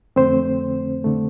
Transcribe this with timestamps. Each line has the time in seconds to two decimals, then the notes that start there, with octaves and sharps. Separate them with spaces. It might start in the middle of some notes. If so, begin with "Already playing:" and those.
0.16 F2 D3 A3 C4 C5
1.04 D3 A3